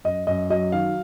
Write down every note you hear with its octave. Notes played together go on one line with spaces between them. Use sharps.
F#2 D#5
F#2 D#5
F#3 D#5
D#3 F5